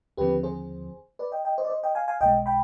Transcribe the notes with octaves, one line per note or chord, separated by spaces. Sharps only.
D#2 D3 F3 C4 G4 B4
G#4 C5
B4 D5
D#5 G5
D#5 G5
C5 D#5
D5
C5 D#5
D#5 G5
F5 G#5
F5 G#5
B1 B2 G#3 D#5 G5
G5 B5